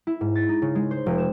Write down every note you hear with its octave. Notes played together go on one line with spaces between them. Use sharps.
E4
G#2
A6
D#4
C#3
G#3
C5
F1
E7